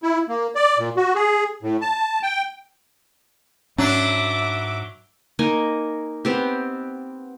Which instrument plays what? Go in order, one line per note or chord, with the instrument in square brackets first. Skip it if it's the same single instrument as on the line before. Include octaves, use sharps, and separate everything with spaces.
[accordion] E4
A#3
D5
A#2
F#4
G#4
A2
A5
G5
[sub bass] G#2 [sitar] F#3 D4 [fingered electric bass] C#4 [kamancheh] E5 D6
[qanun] A#3 D#4 G#5
B3 C4 G4